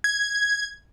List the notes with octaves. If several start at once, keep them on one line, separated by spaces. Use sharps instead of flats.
G#6